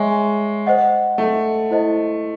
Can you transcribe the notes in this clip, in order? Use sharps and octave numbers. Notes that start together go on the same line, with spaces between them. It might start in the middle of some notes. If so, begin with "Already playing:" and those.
Already playing: G#3 C#5 E5 G#5 C#6
C5 D#5 F#5
A3
E4 C5 D#5